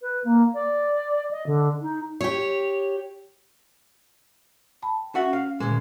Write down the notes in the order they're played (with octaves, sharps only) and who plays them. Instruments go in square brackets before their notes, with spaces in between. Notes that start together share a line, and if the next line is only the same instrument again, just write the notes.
[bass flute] B4
A#3
D5
D#5
D3
D#4
[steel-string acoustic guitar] G4 C#5
[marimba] G5 A5 B5
[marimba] C#4 [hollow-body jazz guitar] F#4 E5 F#5
[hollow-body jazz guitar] F5
[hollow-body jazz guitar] D2 G#3 [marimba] A#2 D#3